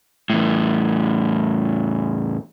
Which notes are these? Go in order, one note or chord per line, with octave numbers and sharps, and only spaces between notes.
E2 A2